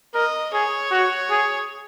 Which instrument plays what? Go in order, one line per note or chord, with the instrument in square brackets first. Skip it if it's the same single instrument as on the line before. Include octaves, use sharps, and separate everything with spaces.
[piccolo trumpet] A#4 [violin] D#5
[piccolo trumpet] G#4 [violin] C#5
[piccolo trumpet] F#4
G#4